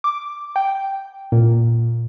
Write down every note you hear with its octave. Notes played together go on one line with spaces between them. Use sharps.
D6
G5
A#2